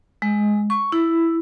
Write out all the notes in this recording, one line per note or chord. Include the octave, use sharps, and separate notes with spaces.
G#3
C#6
E4